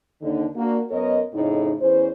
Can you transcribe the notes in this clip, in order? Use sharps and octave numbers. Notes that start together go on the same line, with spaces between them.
D#2 D3
A#3 D4 F#4
F#2 B3 A#4 C#5 D#5
F2 A2 C#3 A3 D#4
E2 E3 C#4 C5